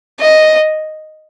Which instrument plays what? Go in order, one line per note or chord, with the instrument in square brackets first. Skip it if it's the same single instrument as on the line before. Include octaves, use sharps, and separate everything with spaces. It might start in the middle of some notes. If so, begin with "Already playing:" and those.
[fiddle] D#5